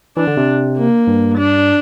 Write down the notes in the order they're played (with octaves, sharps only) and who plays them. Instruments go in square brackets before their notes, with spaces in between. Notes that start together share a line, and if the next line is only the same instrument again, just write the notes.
[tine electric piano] E3 [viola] D4
[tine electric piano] D3
C3
[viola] A#3
[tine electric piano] G2
[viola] D4